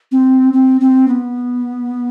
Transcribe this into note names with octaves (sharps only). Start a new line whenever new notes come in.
C4
C4
C4
B3